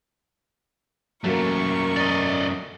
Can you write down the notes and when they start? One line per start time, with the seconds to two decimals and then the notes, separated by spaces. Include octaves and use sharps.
1.24 F#2 F#3 A3 A#3 A#4 C#6
1.97 D5 D#5